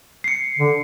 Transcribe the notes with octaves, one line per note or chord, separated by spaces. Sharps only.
C7 C#7
D3